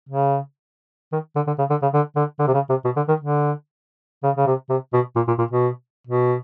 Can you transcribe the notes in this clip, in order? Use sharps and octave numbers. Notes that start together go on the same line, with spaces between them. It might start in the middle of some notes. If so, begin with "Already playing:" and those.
C#3
D#3
D3
D3
C#3
D3
C#3
D3
D3
D3
C3
C#3
C3
B2
D3
D#3
D3
C#3
C#3
C3
C3
B2
A#2
A#2
A#2
B2
B2